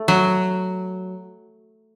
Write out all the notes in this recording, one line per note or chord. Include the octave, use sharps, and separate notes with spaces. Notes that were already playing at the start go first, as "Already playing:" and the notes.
Already playing: A3
F#3